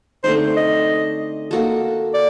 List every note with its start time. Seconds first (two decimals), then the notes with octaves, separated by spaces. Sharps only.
0.24 D3 A3 C4 D#4 C5
0.57 D#5
1.51 A#3 F#4 A4
2.14 D5